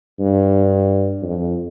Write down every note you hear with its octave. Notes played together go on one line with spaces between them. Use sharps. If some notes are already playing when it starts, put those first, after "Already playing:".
G2
F2